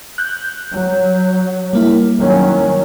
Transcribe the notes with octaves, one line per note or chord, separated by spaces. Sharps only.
F#6 G6
F#3
G3 A#3 E4
D#3 F#3 C#4